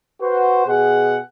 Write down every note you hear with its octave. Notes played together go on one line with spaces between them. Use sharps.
F#4 B4 C5
B2 G#4 F#5